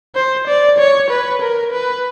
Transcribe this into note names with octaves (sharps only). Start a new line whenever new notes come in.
C5
D5
C#5
B4
A#4
B4